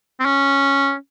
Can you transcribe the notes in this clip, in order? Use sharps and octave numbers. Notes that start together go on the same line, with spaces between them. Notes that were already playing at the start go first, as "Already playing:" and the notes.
C4
C#4